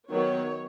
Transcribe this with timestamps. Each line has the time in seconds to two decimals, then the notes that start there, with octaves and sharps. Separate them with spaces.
0.10 D#3 F#3 B3 C#5